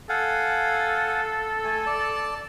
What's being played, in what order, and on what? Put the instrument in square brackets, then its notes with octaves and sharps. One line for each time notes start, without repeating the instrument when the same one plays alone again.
[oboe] A4 [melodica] F5 F#5 G#5
[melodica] A3 G#5
D5 A5